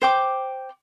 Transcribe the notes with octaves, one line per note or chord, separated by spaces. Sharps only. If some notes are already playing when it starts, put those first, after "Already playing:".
C5 G5 D6